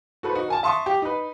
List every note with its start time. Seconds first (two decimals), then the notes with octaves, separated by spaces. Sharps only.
0.23 F#4 A4 B4 C5
0.35 D#4 F#4
0.48 A#4 G#5 A5
0.63 E5 A5 C6 C#6 D#6
0.86 G4
1.02 D#4 B4